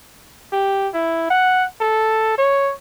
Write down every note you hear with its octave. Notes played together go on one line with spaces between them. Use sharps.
G4
E4
F#5
A4
C#5